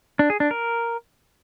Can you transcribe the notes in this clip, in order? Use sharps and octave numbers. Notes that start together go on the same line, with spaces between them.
D4
G#4
D4
A#4